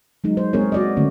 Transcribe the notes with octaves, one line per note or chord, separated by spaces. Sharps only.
F#3 G#3 D#4
C5
G#3 A#3 C4 G#4 A#4 C#5
F#4 D5 D#5
D3 A3 C#4